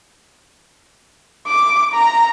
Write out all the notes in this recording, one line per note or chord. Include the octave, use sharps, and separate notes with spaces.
D6
A#5